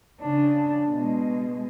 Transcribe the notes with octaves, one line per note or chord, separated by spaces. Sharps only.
C#3 D4
B2 G#3